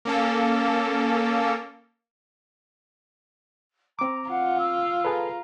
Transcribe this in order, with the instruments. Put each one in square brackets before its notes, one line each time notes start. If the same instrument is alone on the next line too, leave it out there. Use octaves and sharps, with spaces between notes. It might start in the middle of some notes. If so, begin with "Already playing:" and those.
[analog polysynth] A#3 C#4 A4
[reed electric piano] C4 D6 [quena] A#5
[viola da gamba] F4 [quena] F#5
[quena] E6
[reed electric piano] G#4 A4 B4 [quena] A#5